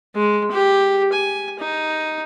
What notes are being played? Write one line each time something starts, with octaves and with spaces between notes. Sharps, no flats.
G#3
G4
G#5
D#4